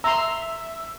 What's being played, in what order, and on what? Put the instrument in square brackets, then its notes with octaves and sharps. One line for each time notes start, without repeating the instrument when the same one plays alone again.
[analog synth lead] E5 [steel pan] A#5 C6 [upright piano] E6